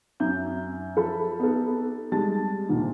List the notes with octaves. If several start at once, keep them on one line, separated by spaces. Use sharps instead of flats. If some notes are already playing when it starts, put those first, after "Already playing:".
F#2 E5 G6
F3 A4 B5
B3 D#4 G4 A4
G3 G#3 A5 A6
G#1 D2 A#2